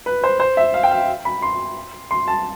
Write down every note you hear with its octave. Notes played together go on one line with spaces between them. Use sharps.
B4
C5
C5
E5
F5
G5
F5
B5
C6
C6
A5